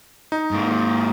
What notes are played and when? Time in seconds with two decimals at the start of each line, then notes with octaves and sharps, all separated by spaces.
0.32 D#4
0.51 G#2 A#3